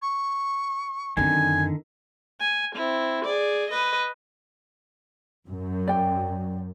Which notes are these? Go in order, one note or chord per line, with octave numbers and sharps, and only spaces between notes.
C#6
F#2 D3 D#3 C4 G#5
G#5
C4 E4
G#4 D5
B4 D#5
F#2
D5 G5